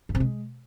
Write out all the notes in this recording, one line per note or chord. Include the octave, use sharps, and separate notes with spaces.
G2
C3
G#3